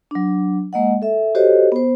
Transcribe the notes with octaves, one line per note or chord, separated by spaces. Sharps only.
F#3 D4
G#3 A#3 D#5 F#5
A4 E5
F#4 G4 A4 C5 C#5 D#5
B3 C5